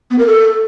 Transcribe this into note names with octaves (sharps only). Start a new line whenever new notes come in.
B3
A#4
A4